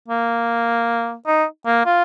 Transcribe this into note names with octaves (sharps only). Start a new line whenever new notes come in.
A#3
D#4
A#3
F4